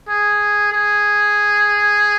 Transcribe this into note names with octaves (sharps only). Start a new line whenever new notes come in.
G#4
G#4